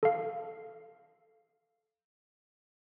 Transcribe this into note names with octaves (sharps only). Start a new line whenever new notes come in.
A4 F5